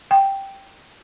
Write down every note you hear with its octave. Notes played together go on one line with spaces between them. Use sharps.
G5